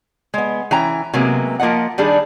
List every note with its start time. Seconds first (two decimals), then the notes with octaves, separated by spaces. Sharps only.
0.34 G#3 B3
0.71 E3 C#4 G5 A#5
1.14 C3 F#3 G#3 A#3 B3
1.60 F3 A#3 F4 D#5 F#5
1.98 D#3 G3 D4 G#4